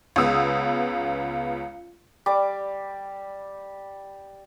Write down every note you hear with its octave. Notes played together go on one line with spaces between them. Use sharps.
C#2 C#3 B3 D#6 E6
G3 D6